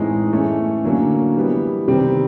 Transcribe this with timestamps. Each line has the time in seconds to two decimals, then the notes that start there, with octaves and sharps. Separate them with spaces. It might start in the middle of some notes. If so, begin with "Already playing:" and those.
Already playing: A2 E3 G#3 C4 D#4
0.32 E3 A3 C#4
0.83 D3 F#3 A#3 C#4
1.36 E3 G3 B3
1.88 C3 D#3 G3 C4